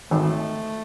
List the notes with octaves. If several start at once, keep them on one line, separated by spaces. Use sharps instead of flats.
G#1 A3